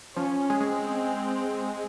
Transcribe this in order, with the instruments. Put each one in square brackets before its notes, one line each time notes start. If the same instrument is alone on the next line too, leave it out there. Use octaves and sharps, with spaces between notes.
[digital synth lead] F3 [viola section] C#4
[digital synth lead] G#3
[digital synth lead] G#3 [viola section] C4